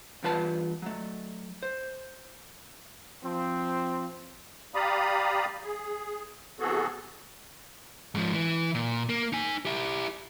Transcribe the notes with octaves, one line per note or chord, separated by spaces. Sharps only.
E2 G2 F4 B4 A5
F#3 A3
C5
F3 C4
G4 D5 F5 A#5 B5 D#6
G#4
C3 E3 B3 F#4 G#4 A4
G#2 F3
E3
A#2
A#3
D#4 G#5
E4 G4